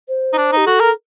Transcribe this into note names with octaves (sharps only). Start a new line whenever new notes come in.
C5
D#4
D4
D#4 G4
F#4 A4
A#4